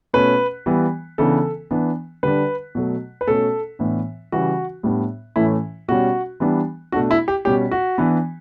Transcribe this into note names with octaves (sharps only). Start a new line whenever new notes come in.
B2 A3 C#4 B4
E3 G3 B3
C#3 E3 B3 D4 A4
E3 B3 D4
D3 G3 D4 B4
B2 F#3 A3
B4
B2 A3 C#4 A4
A2 E3 B3 D4
C#3 E3 G3 F#4
A2 G3 B3 D4
A2 E3 A3 C#4 E4
B2 G3 C#4 F#4
E3 G3 B3 D4
B2 A3 D4 F#4
E4
G4
B2 G3 C#4 G4
F#4
E3 B3 D4